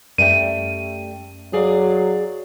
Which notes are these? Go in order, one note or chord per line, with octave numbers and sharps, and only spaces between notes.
F#2 G3 A3 G5 D#7
F#3 G#4 D5 F5